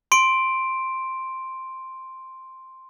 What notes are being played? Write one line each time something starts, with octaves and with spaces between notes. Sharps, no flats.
C6 D7